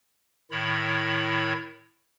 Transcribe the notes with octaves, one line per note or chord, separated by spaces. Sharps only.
A2 D#3 E4 C#5 B5